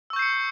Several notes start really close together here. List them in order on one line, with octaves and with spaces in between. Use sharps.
E6 C#6 G6 C7 C#7